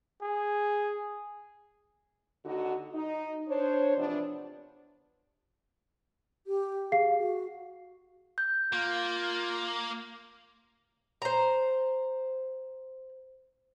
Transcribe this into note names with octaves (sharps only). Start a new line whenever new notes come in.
G#4
D#2 D3 D#4 F#4
D#4
D4 C5 C#5
E2 C3 F3 B3 D4
G4
G#4 F5 C7
F#4
G6
A#3 F4
C5 A#5